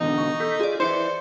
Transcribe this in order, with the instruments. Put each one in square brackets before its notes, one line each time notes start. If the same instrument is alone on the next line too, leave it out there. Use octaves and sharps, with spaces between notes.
[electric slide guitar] E2 B2 D3 [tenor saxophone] D#4
[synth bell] C#6
[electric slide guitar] A4 [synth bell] G6 B6
[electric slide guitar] F4 [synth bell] G#4 D5
[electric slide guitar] E4 B4 E5 [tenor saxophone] C5 [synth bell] D5 C#7